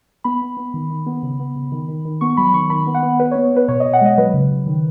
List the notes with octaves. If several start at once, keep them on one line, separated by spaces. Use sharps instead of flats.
B3 B5
B3
B3
D#3
D#3
B3
C#3
B3
C#3
D#3
D#3
D#3
B3 C#6
F#3 B5
D#3 C#6
D#3 B5
B3
F#5
B3
B3 B4
B3 C#5
B3 B4
B2 C#5
B2 D#5
F#5
G#3 D#5
F#3 B4
C#3
C#3
D#3